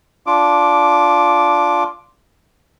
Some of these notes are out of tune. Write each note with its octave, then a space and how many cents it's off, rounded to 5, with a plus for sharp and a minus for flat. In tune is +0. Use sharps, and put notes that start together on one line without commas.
D4 -15 F4 +0 D6 +0